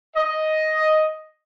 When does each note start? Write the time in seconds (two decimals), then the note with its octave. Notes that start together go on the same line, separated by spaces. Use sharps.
0.16 D#5